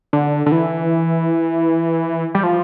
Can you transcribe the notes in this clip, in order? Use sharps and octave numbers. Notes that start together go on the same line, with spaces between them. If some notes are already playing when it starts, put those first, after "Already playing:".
D3
D3
E3
G3
F3